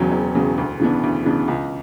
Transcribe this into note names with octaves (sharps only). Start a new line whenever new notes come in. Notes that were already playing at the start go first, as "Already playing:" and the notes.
Already playing: E1 E2 C#3 F#3
E1
E2 C#3 F#3
D2
C#3 E3 B3 D4
D2
C#3 E3 B3 D4
C#2